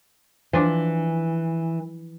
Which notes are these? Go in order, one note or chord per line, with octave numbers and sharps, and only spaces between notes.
E3 F3 D4